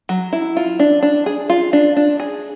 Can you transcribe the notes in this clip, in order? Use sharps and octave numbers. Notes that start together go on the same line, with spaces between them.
F#3
E4
F4
D4
D4
G#4
F4
D4
D4
G#4